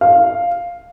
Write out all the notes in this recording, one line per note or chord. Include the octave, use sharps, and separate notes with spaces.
F5